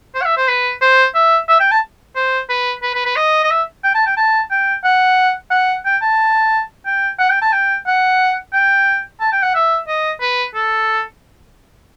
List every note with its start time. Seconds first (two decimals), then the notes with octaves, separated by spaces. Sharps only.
0.15 C5
0.21 F#5
0.25 E5
0.37 C5
0.48 B4
0.82 C5
1.15 E5
1.48 E5
1.60 G5
1.71 A5
2.16 C5
2.49 B4
2.83 B4
2.94 B4
3.05 B4
3.16 D#5
3.44 D#5
3.51 E5
3.84 G5
3.95 A5
4.06 G5
4.17 A5
4.51 G5
4.84 F#5
5.51 F#5
5.85 G5
6.02 A5
6.86 G5
7.19 F#5
7.30 G5
7.41 A5
7.52 G5
7.87 F#5
8.53 G5
9.20 A5
9.32 G5
9.43 F#5
9.55 E5
9.88 D#5
10.21 B4
10.54 A4